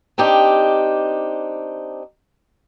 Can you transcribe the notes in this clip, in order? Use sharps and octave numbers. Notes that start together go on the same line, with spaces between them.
C4 D4 D#4 G4